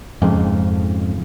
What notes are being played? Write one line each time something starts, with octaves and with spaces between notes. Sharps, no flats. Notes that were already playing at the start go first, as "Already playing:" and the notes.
F2 G#2 C#3